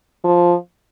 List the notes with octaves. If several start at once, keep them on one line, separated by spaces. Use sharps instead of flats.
F3